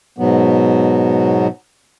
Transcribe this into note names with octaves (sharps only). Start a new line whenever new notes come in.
G#2 B2 F#3 B3